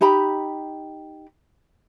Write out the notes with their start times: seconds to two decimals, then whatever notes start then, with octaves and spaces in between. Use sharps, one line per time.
0.01 D#4 G4 A#5 B5